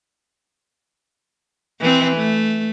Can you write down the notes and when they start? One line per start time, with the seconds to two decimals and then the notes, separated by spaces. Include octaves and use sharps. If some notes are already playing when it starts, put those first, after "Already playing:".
1.80 E3 C4
2.17 A3